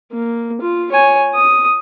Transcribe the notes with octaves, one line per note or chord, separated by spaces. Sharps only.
A#3
F4
C#5 G#5
D#6